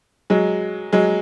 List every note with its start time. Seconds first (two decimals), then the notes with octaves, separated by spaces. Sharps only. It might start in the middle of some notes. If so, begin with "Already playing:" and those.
0.30 F#3 G#3
0.93 F#3 G#3